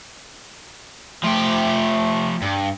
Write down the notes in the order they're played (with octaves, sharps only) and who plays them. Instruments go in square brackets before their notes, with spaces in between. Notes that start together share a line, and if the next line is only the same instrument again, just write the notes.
[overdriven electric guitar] F3 G4 [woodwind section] A3
[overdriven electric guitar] G2